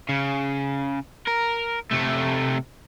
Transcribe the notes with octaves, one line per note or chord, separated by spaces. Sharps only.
C#3
A#4
C3 A3